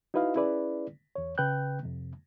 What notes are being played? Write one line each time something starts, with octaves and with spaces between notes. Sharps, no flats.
D#4 E4 F#4 B4 D#5 F5
C#4 E4 G#4 B4 D5
E2 C#5
C#3 B4 G5 F#6 G6
F2 C3